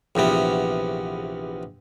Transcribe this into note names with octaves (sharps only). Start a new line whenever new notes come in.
A#1 E2 C3 B3